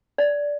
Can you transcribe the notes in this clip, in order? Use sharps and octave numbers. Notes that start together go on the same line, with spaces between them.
D5